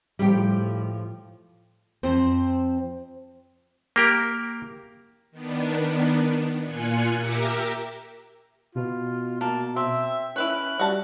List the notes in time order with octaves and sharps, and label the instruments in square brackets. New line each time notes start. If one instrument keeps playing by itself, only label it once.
[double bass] A2 F3 [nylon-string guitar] G3 G4
[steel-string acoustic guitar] F2 F3 C4 C5
[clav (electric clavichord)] A#3 G4 A#4
[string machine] D#3 B3 D4
A#2 F4 G#5 F#6 C#7
G4 A#4 E5 A#5 D6
[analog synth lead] B2 [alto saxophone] F4
[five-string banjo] A#3 [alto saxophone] A5
[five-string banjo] C4 [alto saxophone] E5
[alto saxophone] C#4 [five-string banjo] E4 B4 C#5 [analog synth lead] F#6
[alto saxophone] G3 [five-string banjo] F#4 A5